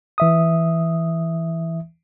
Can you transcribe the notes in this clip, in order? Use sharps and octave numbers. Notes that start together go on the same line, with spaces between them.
E3 E5 D#6